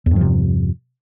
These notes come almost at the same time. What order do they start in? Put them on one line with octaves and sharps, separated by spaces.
E2 G2 F3 C3